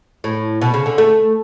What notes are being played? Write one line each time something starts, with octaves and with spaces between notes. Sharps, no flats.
A2
B2
C#3
D3
A3